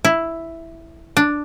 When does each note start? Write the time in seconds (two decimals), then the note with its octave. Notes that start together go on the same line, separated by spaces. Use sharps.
0.05 E4
1.17 D4